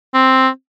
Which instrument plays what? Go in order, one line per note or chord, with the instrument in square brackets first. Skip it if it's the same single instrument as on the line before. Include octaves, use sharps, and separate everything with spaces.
[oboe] C4